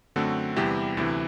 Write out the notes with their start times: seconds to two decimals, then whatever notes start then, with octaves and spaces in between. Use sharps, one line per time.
0.16 F#2 D3 A3 C4 F#4 A4
0.56 E2 C3 G3 B3 E4 G4
0.97 D2 C3 E3 E4